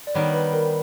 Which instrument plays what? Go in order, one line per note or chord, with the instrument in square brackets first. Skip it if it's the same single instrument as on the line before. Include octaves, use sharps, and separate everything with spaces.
[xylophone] D5
[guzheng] D#3 G3 B3 [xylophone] C#5
[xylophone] B4
A#4